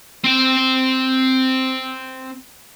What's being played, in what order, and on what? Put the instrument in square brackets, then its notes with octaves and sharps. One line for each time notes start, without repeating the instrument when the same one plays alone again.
[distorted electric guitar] C4 G5